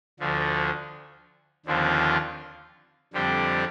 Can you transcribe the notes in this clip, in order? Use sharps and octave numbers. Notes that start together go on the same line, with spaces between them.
D2 D3 F3
D#2 D3 F3 C4 F4
F2 D3 G3 C4 G4